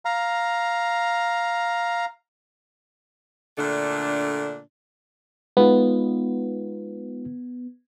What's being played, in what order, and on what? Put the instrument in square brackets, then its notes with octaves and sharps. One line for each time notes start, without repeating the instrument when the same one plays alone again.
[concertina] F5 A#5
[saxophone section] A#2 D3 A3 D4
[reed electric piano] G#3 D#4 F4 [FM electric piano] B3